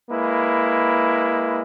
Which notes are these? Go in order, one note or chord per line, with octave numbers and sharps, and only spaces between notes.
G#3 A#3 E4 B4